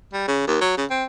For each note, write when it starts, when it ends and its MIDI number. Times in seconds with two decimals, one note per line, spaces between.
0.13 0.24 55
0.28 0.44 49
0.47 0.58 39
0.61 0.76 54
0.77 0.85 49
0.90 1.04 60